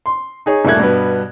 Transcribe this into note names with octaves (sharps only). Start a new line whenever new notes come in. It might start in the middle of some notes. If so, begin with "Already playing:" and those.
C6
D#4 G#4 C#5
D#1 G2 A#2 A3 F#6 G#6
G2 B2 B3